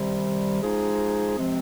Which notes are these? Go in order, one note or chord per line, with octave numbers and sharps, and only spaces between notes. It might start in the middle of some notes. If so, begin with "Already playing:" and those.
Already playing: C3 D#3 G3
F3 G#3 D#4 G#4
C3 F3 G#3 C4